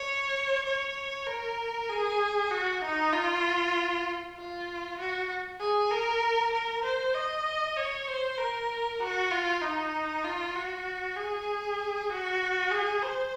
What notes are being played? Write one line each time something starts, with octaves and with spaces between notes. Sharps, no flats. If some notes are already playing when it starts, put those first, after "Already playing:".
Already playing: C#5
C#5
A#4
G#4
F#4
D#4
F4
F4
F#4
G#4
A#4
A#4
C5
D#5
C#5
C5
A#4
F#4
F4
D#4
F4
F#4
G#4
F#4
G#4
C5